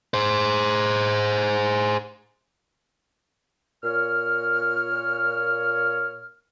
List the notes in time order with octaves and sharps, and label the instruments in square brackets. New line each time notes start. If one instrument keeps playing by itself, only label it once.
[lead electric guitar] G#4 C5
[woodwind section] A#2 C#5 F6